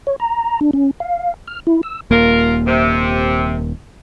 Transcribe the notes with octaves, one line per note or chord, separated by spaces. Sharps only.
C#5
A#5
D4
C#4
F5
F6
E4
E6
D#1 A#3 F4 A#4
C3